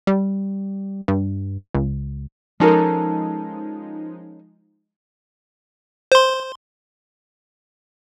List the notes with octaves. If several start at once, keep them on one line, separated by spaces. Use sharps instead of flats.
G3
G2
C#2
F3 G#3 C#4 D#4 A4 A#4
C5 C6